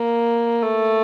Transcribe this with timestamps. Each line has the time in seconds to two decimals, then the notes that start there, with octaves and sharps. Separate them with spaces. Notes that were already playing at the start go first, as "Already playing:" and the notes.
Already playing: A#3
0.63 A3